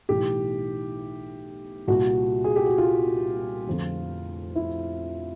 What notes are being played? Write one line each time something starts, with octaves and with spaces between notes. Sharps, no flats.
B1 A2 E3 G4
C2 A#2 F#4
G#4
G4
F#4
F4
F1 F2 D3
E4